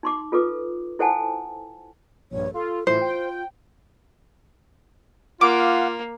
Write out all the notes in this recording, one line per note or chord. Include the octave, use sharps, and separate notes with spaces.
D#4 C6 D6
F4 A4 B4 D6
E4 A4 C5 F#5 G#5 A5
A#1 G2 C#5
F4 A4
A2 E3 E4 F4 C5
G5
A#3 F4 F5 F#5 D6